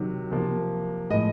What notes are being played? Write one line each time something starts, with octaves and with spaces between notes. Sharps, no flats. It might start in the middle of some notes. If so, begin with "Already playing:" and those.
Already playing: C3 D#3 F#3
C3 F3 A#3
A2 F3 G#3 D#5